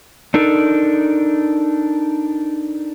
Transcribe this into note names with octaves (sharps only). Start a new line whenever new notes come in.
D4 D#4 A4 A#4